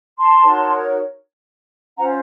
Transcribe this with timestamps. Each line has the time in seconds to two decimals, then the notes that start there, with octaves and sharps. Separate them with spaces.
0.18 A5 C6
0.43 D#4 F#4 A#4 C#5
1.97 C#4 F4 C5 F#5 A#5